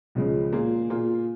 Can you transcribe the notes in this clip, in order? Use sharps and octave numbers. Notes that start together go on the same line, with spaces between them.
C#2 C#3 F3 G#3 C#4
A#2 A#3 F4 G#4
A#2 A#3 F4 G#4